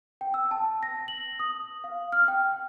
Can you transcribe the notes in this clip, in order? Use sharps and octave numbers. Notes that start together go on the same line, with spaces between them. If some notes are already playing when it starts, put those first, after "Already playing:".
G5
E6
A5
A#6
F#7
D#6
F5
F6
G5